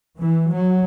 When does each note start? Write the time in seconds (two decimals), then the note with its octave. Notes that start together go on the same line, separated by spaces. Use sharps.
0.20 E3
0.53 F#3